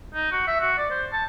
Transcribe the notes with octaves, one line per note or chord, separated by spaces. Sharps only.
D#4
F#4
E5
F#4
D5
C5
A5